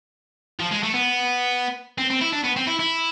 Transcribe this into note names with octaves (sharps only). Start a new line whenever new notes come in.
F3
G#3
A3
B3
C4
C4
E4
D4
B3
C4
E4
E4